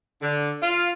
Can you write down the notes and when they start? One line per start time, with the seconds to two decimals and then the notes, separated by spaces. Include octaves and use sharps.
0.21 D3
0.61 F4